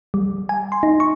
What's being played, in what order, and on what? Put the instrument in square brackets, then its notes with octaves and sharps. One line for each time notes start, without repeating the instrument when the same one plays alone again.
[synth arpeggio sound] G3
G#5
C6
D#4
C#6